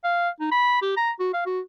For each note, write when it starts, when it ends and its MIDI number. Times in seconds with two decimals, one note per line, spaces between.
0.04 0.29 77
0.40 0.51 63
0.51 0.82 83
0.82 0.94 67
0.97 1.11 82
1.20 1.31 66
1.33 1.41 77
1.46 1.60 66